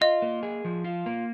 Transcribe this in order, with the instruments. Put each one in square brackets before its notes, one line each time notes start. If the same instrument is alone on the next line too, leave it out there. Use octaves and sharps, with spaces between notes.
[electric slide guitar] F4 [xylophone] D#5
[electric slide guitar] A#3
G#4
F3
F4
A#3